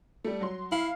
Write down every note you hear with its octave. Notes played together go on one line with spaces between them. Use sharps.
G3 A3
F#3 C6
E4 F5